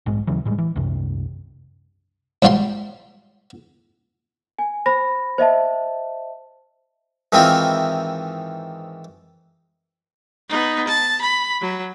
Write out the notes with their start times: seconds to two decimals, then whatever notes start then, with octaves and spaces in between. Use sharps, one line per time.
0.06 A#1 G#2 G#3
0.27 D#2 C#3 E3 F#3
0.45 A2 G3 G#3
0.58 E3
0.76 C2 F#2 C3
2.42 G#2 F#3 G3 F4 G5 C6
4.59 G#5
4.86 C5 B5 A#6
5.38 C5 D#5 E5 A5
7.32 G#2 D#3 E3 C4 E4 F4
10.49 B3 D#4
10.87 A5
11.21 B5
11.61 F#3